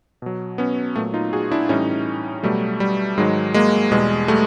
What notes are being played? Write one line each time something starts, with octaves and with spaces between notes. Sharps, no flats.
B2 F#3
B3 C#4
A#2 F#3 A3 B3
D#4 F4
F#4 G#4
D4 E4
A2 E3 G3 C#4 D#4
B2 F#3 G3 A3
G3
G#2 D#3 F#3 G#3
G#3 A#3
E2 B2 G3 G#3
G3 A3